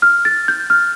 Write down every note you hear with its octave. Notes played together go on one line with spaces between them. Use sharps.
F6
A6
G6
F6